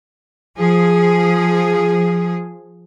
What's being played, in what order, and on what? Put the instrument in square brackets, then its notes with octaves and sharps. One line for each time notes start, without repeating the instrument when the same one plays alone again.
[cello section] F3 G#4